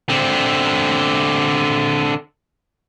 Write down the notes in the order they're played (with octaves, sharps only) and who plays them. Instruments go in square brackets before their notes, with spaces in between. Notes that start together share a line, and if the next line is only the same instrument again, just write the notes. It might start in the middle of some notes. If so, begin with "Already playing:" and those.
[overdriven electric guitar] D3 C4